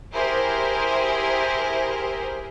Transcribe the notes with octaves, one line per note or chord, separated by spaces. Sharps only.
E4 G4 G#4 A#4 C5